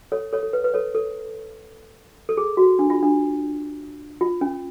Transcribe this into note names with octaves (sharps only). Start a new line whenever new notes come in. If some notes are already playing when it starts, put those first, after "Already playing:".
A4 C#5
A4 C#5
A4
B4
B4
A4 C#5
A4
A4
G#4
F#4
D4
F4
D4
F4
C#4